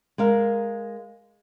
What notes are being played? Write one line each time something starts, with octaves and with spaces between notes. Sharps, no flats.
G#3 A#4 F5